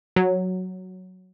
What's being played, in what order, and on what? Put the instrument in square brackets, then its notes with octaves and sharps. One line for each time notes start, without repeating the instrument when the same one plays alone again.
[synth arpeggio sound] F#3